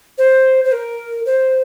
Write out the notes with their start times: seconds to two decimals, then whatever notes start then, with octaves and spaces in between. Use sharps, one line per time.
0.18 C5
0.64 C5
0.72 A#4
1.25 C5